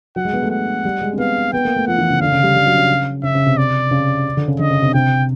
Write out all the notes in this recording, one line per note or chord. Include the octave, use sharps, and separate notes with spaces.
F#3 F#5
G#3
B3
A3
F#5
G3
G#3
C4
B3 F5
B3 G5
A#3
A3
F3 F#5
E3
C#3
D3 F5
C#3
G3
G3
F#3
C#3
C#3 E5
C#3
C3
D5
C#3
D3
C#3
D3 D#5
C#3
C3
C3 G5